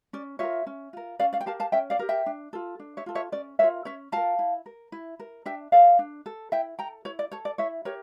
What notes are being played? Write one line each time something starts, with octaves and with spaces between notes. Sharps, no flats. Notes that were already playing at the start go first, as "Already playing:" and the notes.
C#4 D5
F4 A#4 C#5 E5
C#4
F4 A#4
C#4 D5 F5
D5 F5
G5
G4 A#4 F5 A5
F5 A5
C#4 E5 G5
D5 F5
G4 A#4
E5 G5
D4
F4 A4
D4
C#5 E5
F4 A4
C#5 E5
C#4 D5
F4 A#4 C#5 E5
C#4 C#5 E5
F4 A#4 F5 A5
E4
A#4
E4
A#4
D4 E5 G5
A4 D5 F5
D4
A4
E4 E5 G5
A4 G5 A#5
E4 C#5
D5
A4 C#5
D5
E4 C#5 E5
G4 A#4 C#5